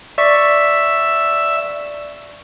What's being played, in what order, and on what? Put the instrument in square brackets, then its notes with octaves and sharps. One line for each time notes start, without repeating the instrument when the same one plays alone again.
[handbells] D5 C#6 B6 [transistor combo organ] E5